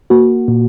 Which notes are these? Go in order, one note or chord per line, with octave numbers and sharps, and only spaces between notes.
A#3 F#4
A#2